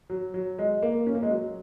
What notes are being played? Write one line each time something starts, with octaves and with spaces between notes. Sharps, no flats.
F#3
F#3
G#3
A#3
C#4
A#3
G#3
F#3